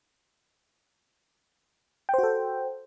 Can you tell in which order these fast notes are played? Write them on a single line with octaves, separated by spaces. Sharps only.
G5 C5 F#4 A4